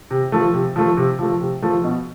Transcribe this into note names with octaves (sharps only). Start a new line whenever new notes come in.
C3
F3 A3
C3
F3 A3
C3
F3 A3
C3
F3 A3
B2